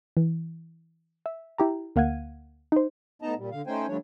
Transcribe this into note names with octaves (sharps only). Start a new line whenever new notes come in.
E3
E5
E4 G4 A#5
D2 A#3 F5 F#5 G#6 D#7
D#4 C5
A2 B3 D#4 D#5 A5 A#5
A#2 G3
D3 F5
A3 C#4 D#4 C5 G5 G#5
D3 F3 G3 A3 D4 C#5